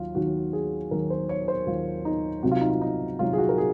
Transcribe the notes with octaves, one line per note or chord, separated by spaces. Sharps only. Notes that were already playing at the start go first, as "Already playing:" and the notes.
Already playing: D#2 D#3 F#3 F4
D#2 D#3 F#3 F#4
G#4
D#2 D#3 F#3 A#4
C5
C#5
C5
D#2 D#3 F#3 F4
D#4
C2 C3 D#3 F#3 F#4
F4
D#4
F4
D#4
C2 C3 D#3 F#3 F4
G#4
F#4
A#4
G#4